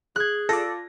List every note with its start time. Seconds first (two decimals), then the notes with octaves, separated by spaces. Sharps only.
0.16 G#4 F#6 G#6
0.49 F4 A4 D5 A#6